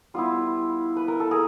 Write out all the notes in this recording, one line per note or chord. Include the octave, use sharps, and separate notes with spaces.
G3 B3 E4 F4
B4
A#4
A4
G#4 A#4